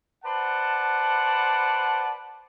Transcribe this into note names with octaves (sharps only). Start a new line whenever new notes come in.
B4 C5 D5 F#5 A5